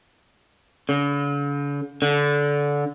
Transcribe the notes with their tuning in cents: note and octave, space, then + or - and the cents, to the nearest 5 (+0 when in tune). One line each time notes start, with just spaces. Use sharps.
D3 -45
D3 -20